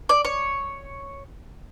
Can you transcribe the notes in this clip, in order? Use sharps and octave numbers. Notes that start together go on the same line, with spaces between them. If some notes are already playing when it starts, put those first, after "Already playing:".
D5
C#5